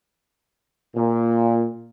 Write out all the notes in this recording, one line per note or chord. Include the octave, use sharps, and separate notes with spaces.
A#2